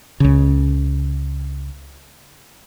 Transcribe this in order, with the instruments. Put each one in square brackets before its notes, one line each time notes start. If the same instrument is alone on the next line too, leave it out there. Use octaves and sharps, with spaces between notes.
[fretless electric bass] C#2 C#3